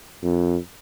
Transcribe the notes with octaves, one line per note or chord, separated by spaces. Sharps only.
F2